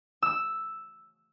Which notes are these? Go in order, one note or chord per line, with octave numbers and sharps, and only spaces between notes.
E6